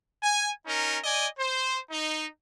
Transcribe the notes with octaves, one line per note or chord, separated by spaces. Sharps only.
G#5
C#4 D#4 A#4
D5 D#5 G#5
C5
D#4